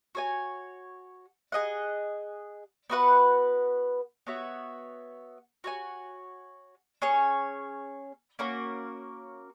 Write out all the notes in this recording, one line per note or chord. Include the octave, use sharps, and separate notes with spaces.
F#4 C#5 G#5
G#4 D#5 F#5
B3 F#4 B4 F#5
B3 F#4 C#5 E5
F#4 C#5 G#5
C#4 G#4 C#5
A#3 C#4 F#4 A#4